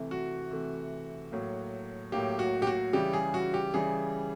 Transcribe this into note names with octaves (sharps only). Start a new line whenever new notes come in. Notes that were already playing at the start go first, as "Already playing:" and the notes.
Already playing: C3 E3 A3
F#4
C3 E3 A3
A2 F#3 A#3
A2 F#3 A#3 G4
F#4
G4
F#4
C#3 E3 G3 G4
G#4
F#4
G4
C#3 E3 G3 G#4